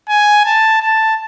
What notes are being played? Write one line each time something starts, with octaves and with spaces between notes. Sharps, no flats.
G#5
A5
A5